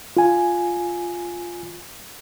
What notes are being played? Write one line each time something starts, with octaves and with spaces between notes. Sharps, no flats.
F4 G#5